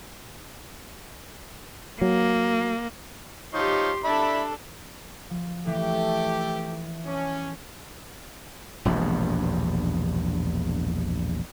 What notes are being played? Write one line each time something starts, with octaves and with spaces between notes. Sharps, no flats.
F#3 A#3
F3 D#4 G4 C#5 C6
D4 A4 D5 E5 B5
F3
E3 A3 G4
C#4 G#4 A5 D6
E1 A#1 E2 G2